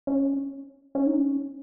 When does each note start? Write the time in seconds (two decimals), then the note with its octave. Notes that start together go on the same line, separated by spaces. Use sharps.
0.07 C#4
0.95 C#4
1.06 D#4
1.16 C#4